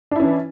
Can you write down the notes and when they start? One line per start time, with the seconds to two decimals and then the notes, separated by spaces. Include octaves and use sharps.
0.11 D4
0.16 E4
0.20 C#4
0.24 E3